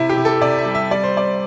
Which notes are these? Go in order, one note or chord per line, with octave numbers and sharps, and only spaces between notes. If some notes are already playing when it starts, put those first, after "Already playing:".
Already playing: C3 E4
G4
C3
A4
C3 D5
E5
G3
E5
G3 D5
C5
G3 D5